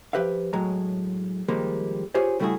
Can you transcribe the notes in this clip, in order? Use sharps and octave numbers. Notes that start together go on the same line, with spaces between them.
F3 G3 G4 B4 E5 F5
A2 F#3 G#3 A#5
D#3 F3 G3 G#3 A#3
F4 G4 G#4 C5 C#5
C#3 G3 A3 E4 F#4 G#4